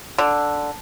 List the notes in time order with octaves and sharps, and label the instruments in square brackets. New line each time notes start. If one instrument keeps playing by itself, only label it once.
[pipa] D3